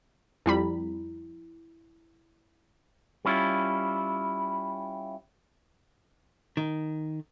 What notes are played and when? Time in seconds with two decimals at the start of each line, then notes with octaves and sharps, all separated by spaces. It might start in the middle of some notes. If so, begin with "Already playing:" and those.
0.46 F2 G3 E4 B5
3.25 G3 C#4 E4 F4
6.57 D#3